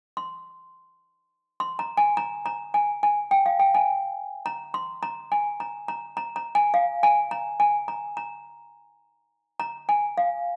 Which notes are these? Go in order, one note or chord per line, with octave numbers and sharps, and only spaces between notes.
C6
C6
A#5
G#5
A#5
A#5
G#5
G#5
G5
F5
G5
G#5
A#5
C6
A#5
G#5
A#5
A#5
A#5
A#5
G#5
F5
G#5
A#5
G#5
A#5
A#5
A#5
G#5
F5